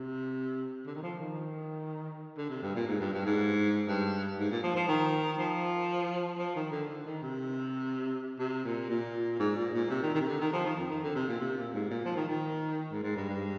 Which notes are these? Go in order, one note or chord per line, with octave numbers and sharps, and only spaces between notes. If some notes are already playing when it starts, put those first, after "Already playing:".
Already playing: C3
D3
D#3
F3
D#3
D3
C3
G2
A#2
G#2
G2
G2
G#2
G2
G#2
A#2
F3
F3
D#3
F3
F3
D#3
D3
D3
D#3
C3
C3
A#2
A#2
G#2
A#2
A#2
C3
D#3
D#3
C3
D3
D#3
F3
D#3
F2
D#3
D3
C3
A#2
C3
A#2
G#2
A#2
F3
D#3
D#3
G#2
G#2
G2
G2